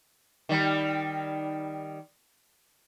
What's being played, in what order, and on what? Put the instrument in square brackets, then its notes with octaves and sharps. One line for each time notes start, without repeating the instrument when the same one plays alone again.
[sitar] D#3 G3